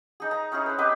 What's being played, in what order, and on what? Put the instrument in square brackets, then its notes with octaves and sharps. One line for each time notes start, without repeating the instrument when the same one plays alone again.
[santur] D#4 G#4
A#5
C#4 D#4 E4 G#4
B4 C5
C4 G4 B4 D#5